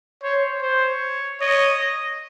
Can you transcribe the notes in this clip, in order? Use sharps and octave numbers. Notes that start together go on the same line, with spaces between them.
C5 C#5
C5 C#5
C#5 D#5
D#5